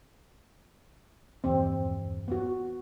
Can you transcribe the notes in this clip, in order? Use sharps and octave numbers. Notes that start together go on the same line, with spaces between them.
D#1 E2 G2 C4
B3 F#4